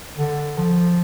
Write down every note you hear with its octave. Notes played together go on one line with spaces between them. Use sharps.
D3
F3